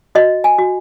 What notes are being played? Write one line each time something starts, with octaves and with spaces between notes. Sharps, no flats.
F#4 D#5
G#5
F#4